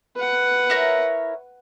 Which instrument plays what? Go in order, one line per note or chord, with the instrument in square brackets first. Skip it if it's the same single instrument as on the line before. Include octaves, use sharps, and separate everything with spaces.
[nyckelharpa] B4 F#5
[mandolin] E4 A#4 C#5